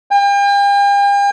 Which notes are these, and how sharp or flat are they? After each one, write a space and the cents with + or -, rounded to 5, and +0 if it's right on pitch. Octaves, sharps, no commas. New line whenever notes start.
G5 +45